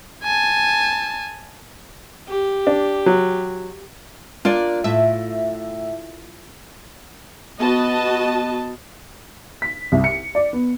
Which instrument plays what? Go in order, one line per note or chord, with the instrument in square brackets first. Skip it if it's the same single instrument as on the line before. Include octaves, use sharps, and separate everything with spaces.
[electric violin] G#5 A5
[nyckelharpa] G4
[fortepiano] D4
F#3
[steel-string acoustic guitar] A#3 D4 D5 [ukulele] F4
[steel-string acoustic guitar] A2 [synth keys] E5
[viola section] B3 F#4 D#5 A5
[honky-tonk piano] B6
C2
C#7
D5
B3